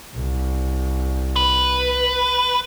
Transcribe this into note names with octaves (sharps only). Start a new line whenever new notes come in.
C2
B4